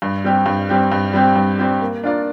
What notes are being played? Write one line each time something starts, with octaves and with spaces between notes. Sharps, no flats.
G2
G3 C4 G4
G2
G3 C4 G4
G2
G3 C4 G4
G2
G3 C4 G4
A#3
D4 F4 A#4 D5